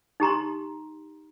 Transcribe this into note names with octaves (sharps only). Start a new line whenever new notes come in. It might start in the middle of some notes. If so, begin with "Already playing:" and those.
D#4 G4 A#5 C6